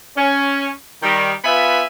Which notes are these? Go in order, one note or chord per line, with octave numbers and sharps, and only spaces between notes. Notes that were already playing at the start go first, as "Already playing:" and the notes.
C#4
D#3 G3
B3 F4 B4 E5 G#5 B5